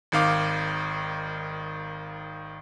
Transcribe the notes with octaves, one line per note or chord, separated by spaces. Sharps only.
G#1 D#3 F5 D6